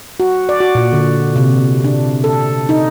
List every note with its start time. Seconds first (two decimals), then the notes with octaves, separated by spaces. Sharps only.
0.20 F#4
0.49 D5
0.60 F#4
0.75 A#2
0.93 D3
1.36 C3
1.84 D4
2.24 A4
2.69 D#4